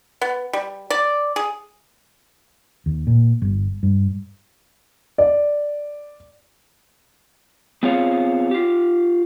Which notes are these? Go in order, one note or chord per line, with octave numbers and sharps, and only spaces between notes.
B3
G3
D5
G#4
D#2
A#2
G1
G2
D5
B3 C4 F4 G#4 C#5 F5
F4 G4